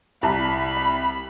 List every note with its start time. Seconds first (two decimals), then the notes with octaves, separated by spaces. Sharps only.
0.23 C2 E4 A5 B5
0.77 F#5